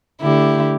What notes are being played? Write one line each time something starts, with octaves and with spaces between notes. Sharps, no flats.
D3 A3 E4 G4